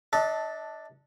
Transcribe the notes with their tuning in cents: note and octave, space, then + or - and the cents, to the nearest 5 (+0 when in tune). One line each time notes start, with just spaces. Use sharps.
D4 +5 A4 +0 D#5 +45